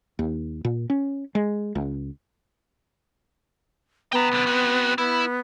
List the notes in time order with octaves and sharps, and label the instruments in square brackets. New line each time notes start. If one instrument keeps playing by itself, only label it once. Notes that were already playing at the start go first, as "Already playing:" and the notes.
[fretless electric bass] D#2
A#2
C#4
G#3
C#2
[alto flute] B3 [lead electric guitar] G5 A#5
[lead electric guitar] B1 D3
C4 F#4
[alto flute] B3 [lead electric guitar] E4